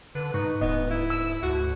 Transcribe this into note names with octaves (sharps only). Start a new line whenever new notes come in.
D3 B4
G#2 D#4 B4 C#6
D1 B3 D#4 D#5
E4
E6
D2 F#4